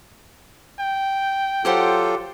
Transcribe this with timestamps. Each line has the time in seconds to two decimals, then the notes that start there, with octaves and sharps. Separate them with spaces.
0.80 G5
1.65 F#3 F4 G4 A4 C5 F#5